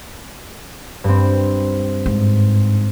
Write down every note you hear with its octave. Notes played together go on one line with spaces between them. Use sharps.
G2 C4
G#2